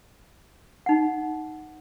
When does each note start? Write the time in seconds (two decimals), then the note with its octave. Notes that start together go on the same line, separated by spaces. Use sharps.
0.86 D#4 F#5